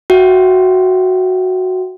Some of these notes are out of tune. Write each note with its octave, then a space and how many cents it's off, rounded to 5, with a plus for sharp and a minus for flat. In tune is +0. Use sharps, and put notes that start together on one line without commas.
F#4 +0 E5 +15 G5 -20